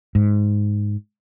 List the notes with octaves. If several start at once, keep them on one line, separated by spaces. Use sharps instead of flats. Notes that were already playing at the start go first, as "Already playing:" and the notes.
G#2